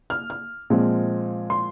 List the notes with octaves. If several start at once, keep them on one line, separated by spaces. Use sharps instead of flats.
F6
F6
A#2 F3 G#3 C4
C6